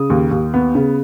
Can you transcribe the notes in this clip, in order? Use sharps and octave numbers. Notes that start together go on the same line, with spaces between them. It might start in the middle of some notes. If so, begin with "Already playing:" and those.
Already playing: C#3 D#6
D#2
D#2
B3
C#3